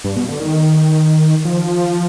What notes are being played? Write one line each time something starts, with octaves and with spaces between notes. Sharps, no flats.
G2
B2
D3
D#3
F3